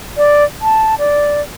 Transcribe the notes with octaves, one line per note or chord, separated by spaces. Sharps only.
D5
A5
D5